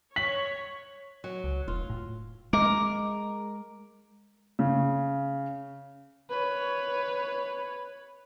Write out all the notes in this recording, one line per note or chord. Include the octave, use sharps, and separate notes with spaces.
C#5 B6 F#7
F#3
C#2
E1 F4
A2
G#3 A#4 D6
C#3
B4 C#5